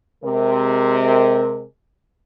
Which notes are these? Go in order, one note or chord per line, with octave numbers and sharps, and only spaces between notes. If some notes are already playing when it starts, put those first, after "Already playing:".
C3 G#3 A#4